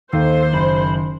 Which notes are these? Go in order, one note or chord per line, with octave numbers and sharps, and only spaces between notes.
D#2 D#3 A4 C5 F5
F#1 B5